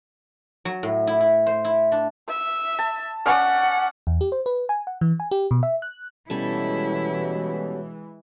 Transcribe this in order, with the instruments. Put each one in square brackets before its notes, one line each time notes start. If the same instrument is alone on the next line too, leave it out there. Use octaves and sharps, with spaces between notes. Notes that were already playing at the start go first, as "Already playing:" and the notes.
[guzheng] F#3
A2
E4
E4
C5
E4
D4
[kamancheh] E5
[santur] A5
[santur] C#4 D5 [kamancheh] F#5
[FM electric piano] E2
G4
C5
B4
G#5
F#5
E3
G#5
G4
B2
E5
F#6
[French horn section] B2 [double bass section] E3 G#3 [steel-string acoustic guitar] G3 C#4 A4 [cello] E4